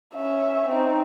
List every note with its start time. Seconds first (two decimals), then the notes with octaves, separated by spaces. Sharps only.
0.14 C#4 E5
0.68 C4 D#4